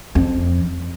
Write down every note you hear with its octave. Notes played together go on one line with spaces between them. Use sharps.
F2